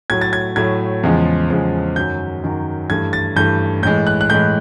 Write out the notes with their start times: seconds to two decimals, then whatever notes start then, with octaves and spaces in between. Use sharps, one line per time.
0.10 A2 F#3 A3 G#6
0.21 A6
0.33 G#6
0.56 A2 F#3 A3 G#6
1.03 E2 C#3 F3 G#3
1.50 E2 C#3 F3 G#3
1.96 F#2 D#3 F#3 G6
2.43 F#2 D#3 F#3
2.89 G2 E3 A3 G#6
3.13 A6
3.36 G2 E3 A3 G6
3.83 A2 E3 G#3 G6
4.07 F#6
4.21 F#6
4.30 A2 E3 G#3 G6